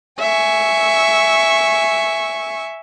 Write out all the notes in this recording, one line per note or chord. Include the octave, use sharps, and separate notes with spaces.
E5 G#5 C#6